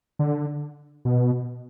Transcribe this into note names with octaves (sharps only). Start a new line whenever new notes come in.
D3
B2